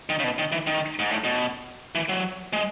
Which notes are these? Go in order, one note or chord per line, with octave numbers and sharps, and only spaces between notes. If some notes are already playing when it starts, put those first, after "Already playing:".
D#3
C#3
B2
D#3
E3
D#3
G#2
A2
B2
E3
F#3
G#3